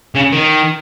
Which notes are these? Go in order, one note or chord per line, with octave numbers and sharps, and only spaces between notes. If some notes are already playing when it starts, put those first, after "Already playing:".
C#3
D#3